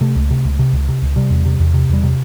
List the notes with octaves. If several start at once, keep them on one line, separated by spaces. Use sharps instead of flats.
C3 A3
C#2
C3
C#2
C3
C#2
C3
C#2
C3 G3
E2
C3
E2
C3
E2 G3
C3